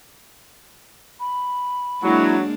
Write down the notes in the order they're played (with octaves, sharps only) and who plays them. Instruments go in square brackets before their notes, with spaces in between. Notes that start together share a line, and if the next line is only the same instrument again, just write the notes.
[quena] B5
[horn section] F#3 [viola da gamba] G#3 A#3 D4 [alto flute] E4